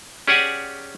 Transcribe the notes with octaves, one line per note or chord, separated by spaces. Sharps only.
C#4 G4 G#4 D5 F#5 G#5